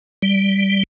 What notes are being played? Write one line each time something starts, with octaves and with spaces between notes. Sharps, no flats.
G3